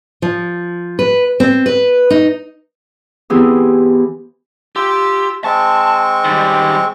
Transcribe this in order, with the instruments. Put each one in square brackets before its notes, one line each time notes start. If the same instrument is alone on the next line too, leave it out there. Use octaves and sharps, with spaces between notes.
[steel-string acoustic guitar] F3
B4
C4
B4
D#4
[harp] E3 B3 C4 E4 G4 G#4
[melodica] F4 E6 [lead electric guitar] G4
[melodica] G#3 C4 C#6 [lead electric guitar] A5
[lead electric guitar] D#3 G3